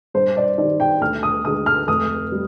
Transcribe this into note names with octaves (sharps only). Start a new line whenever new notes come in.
G2 C5
D5
D#3 G3 D5
G5
D2 F6
D#6
D3 G#3 D#6
F6
F1 D#6
G3